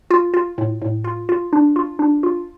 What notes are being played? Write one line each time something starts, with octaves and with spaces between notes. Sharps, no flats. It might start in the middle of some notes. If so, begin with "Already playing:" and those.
F4
F4
A2
A2
F4
F4
D4
F4
D4
F4